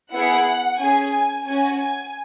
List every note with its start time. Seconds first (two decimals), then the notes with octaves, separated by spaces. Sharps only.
0.14 B3 E4 G#4 F#5
0.80 C#4 G#4 G#5
1.14 G#5
1.47 C#4 F#4 G#5
1.81 G#5